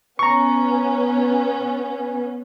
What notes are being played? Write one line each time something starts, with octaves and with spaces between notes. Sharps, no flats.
B3 C#4 A#5 C#6